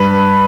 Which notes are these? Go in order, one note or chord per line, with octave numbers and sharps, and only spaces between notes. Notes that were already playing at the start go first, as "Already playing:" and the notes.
Already playing: G2 B4